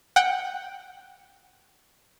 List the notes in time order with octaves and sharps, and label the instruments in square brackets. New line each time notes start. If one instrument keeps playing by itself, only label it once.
[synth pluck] F#5 G5